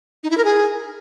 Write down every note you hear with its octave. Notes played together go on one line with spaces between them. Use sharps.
D#4
E4
A#4
G#4